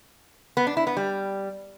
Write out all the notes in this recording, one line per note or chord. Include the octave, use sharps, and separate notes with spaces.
B3
D4
E4
B3
G3